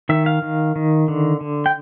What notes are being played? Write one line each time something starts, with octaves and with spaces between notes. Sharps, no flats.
D#3 E5
F5
D#3
D#3
D3
D3
G5